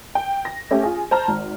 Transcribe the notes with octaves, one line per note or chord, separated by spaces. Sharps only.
G5
A#6
A3 C#4 G4
F4 G#4
C5 A5 A#5 F6
G#1